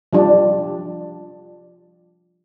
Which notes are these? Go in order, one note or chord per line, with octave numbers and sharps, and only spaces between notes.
F3 G3 D4